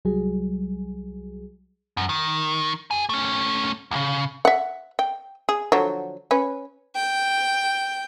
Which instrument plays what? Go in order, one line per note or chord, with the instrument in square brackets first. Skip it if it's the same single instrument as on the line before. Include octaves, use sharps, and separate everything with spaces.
[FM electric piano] C2 F#3 G3 G#4
[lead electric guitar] F#2
D#3
G4 G#5
A3 C#4
D2 C#3
[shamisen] E5 F#5
G5
G#4
D3 F3 F#3
C#4 B4
[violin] G5